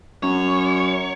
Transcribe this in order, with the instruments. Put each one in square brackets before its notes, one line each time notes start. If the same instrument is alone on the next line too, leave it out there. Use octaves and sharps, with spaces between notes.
[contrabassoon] F#2 [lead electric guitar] C#5